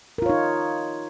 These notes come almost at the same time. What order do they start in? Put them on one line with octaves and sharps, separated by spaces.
A#4 F4 C#5 D#4